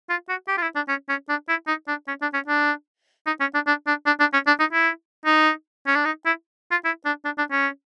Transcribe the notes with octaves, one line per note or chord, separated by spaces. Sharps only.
F4
F#4
G4
F4
E4
D4
C#4
C#4
D4
E4
D#4
D4
C#4
D4
C#4
D4
D#4
C#4
D4
D4
D4
D4
D4
C#4
D4
D#4
E4
D#4
C#4
D4
D#4
E4
F4
E4
D4
D4
D4
C#4